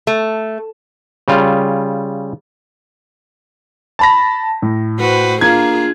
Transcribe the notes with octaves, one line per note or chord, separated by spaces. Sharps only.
A3
C#3 G3 F4
A5 B5 A#6
A2
F#4 B4 C5
A#3 D4 F4 G#4 G#6